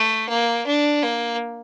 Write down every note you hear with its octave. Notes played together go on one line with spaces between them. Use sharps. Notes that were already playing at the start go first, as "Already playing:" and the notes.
Already playing: A3
A#3
D4
A#3